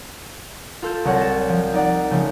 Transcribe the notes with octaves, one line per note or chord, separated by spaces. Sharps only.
F4 A4 G6 E7
C2 F#3 C#5 F#5 A#6
A6 E7
F3
D#4 D5 F#5
C#3 F3 A3